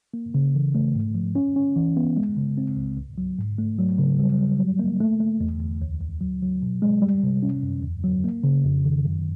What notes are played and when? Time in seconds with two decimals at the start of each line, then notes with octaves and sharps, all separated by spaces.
0.14 A#3
0.34 C#3
0.55 E3
0.75 A3
0.95 G#2
1.15 F3
1.35 C#4
1.56 C#4
1.76 E3
1.97 B3
2.17 G#3
2.37 C#3
2.58 C4
2.77 C#2
2.97 C2
3.18 F#3
3.38 G#2
3.58 A3
3.79 F#3
3.99 C#3
4.20 G3
4.39 G3
4.59 F#3
4.79 A#3
5.01 A3
5.20 A3
5.41 E2
5.60 E2
5.82 D2
6.01 D2
6.21 F#3
6.42 F#3
6.62 B2
6.82 G#3
7.02 G3
7.23 C3
7.43 C#4
7.63 F#2
7.83 E2
8.04 F#3
8.24 A#3
8.44 C#3
8.65 F2
8.85 D#3
9.05 F#2